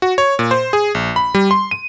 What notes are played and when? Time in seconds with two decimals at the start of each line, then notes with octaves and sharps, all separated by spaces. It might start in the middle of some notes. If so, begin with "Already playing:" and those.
0.02 F#4
0.18 C#5
0.39 A#2
0.51 C5
0.73 G#4
0.95 A#1
1.16 B5
1.35 G3
1.51 C6
1.71 D#7